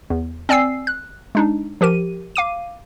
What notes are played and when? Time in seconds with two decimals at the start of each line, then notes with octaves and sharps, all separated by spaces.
0.10 E2
0.49 C4 D5 G#5 E6 C7
0.87 F#6
1.35 G#3 D4 D#4
1.81 F3 G4 A#4 D#7
2.36 F5 D6 D#7